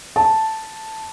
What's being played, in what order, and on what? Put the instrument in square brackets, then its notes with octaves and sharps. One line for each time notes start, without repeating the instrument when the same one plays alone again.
[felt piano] A5